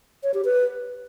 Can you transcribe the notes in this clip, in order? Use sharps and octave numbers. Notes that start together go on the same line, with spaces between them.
C#5
G4
B4